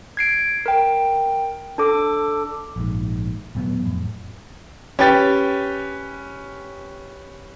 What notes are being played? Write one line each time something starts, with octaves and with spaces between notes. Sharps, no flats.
G#6 C7 D7
A#4 G5
D4 A4 D6
A#1 G#2
D#1 A2 F#3 B3
F2 A2
C#4 G4 B4 G5 A6